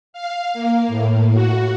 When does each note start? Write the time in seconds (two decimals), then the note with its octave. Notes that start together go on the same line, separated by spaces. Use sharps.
0.13 F5
0.53 A#3
0.88 A2
1.33 F#4